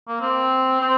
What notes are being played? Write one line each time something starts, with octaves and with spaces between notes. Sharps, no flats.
A#3
C4
C4